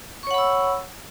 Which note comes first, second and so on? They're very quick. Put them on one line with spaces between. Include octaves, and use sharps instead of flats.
C#6 C#5 F#5 B5 E6